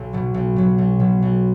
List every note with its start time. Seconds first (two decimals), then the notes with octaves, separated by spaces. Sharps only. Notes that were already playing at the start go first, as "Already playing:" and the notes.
Already playing: B1
0.13 B2 F#3
0.34 B1
0.56 B2 F#3
0.78 B1
1.00 B2 F#3
1.22 B1